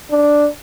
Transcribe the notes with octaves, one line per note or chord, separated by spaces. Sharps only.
D4